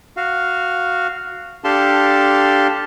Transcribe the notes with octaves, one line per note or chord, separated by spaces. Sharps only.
F#4 F5
D4 G4 A4 F5 A5 C6